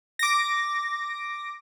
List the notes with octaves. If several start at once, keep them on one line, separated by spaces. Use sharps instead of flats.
D6 A#6